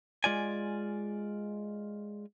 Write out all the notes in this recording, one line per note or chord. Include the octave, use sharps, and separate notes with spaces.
G#3 F4 D5 G#5